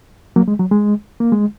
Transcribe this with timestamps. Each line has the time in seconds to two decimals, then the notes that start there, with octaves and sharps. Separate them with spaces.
0.36 F#3 A#3
0.48 G#3
0.59 F#3
0.71 G#3
1.20 A#3
1.32 G#3